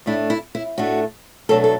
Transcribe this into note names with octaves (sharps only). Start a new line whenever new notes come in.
A2 A3 D4 E4
E4
E4
A2 A3 D4 F#4
B2 F#3 A3 D4 A4
A4